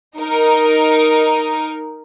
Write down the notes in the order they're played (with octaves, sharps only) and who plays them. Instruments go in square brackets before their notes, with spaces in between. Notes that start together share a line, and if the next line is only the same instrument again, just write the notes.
[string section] D#4 A#4